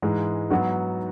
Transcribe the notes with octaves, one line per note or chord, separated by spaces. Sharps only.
G#2 E3 G#3
G#2 F#3 B3 F#4